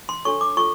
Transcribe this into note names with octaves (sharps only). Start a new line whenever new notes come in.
C6
D4 F#4 A4 C#5 C#6
D6
F4 A4 C#6